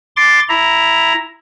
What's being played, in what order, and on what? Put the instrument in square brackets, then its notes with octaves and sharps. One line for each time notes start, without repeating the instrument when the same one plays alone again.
[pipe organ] C6 D6 A6
E4 A#5